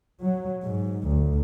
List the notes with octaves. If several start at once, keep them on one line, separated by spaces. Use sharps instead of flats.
F#3
G#2
D2